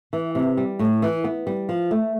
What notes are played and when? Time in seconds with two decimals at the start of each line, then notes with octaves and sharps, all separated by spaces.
0.13 E3
0.35 C3
0.57 G3
0.79 A2
1.02 E3
1.24 B3
1.47 G3
1.69 F3
1.91 A3